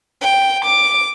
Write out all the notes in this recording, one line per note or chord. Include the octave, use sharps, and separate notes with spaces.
G5
D6